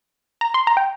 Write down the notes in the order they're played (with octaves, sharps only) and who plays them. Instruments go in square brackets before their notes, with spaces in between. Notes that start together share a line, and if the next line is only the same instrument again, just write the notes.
[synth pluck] A#5
C6
A#5
G5